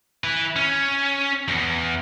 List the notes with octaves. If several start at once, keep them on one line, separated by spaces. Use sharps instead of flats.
E4 B4
C#4
E2